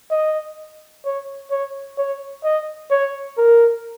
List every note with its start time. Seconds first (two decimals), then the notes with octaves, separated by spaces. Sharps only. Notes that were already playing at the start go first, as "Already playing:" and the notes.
0.11 D#5
1.05 C#5
1.51 C#5
1.98 C#5
2.44 D#5
2.91 C#5
3.38 A#4